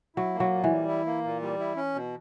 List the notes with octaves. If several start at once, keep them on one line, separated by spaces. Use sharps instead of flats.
F#3 E4
A#3
F#3
A#2
E3
G3
E4
A#3
A#2
G3
E4
C#4
B2